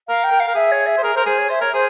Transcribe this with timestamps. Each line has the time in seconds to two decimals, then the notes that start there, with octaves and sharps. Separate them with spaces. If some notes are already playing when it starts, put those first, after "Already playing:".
0.08 A#4 F5
0.24 G5
0.32 A#4
0.40 F5
0.48 A#4
0.55 G#4 E5
0.72 C#5
0.87 E5
0.98 C5
1.03 G#4 A#4
1.15 A#4 C5
1.26 G#4 C5
1.38 C#5
1.49 C5 E5
1.61 A#4 C#5
1.74 G#4 C5